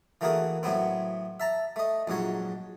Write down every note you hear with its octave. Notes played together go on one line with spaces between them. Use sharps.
E3 A3 A#3 F#4 G#4 A#4
A2 F#3 B3 C4
E5 A5 A#5
A3 D#5
A#1 G#2 F#3 C#5